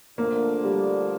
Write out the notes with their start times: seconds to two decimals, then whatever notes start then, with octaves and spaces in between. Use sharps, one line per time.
0.18 D3 F3 A3 A#3 D4
0.64 G3